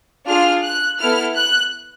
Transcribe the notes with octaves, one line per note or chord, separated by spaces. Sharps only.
D4 F4 G#4 F6
F#6
B3 E4 A4 F6
F#6